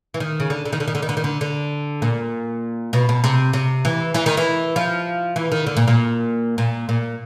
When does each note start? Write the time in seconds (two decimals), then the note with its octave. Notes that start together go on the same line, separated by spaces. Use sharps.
0.14 E3
0.20 D#3
0.40 C#3
0.50 D3
0.65 D3
0.73 D#3
0.80 D3
0.88 D#3
0.95 D3
1.03 D#3
1.09 D3
1.17 D#3
1.24 D3
1.41 D3
2.02 A#2
2.93 B2
3.09 B2
3.24 C3
3.53 C3
3.85 E3
4.14 E3
4.26 D#3
4.37 E3
4.76 F3
5.36 E3
5.52 D#3
5.66 D3
5.77 A#2
5.88 A#2
6.58 A#2
6.89 A#2